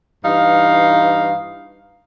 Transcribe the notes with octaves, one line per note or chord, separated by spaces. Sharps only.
G2 E3 D#4 F5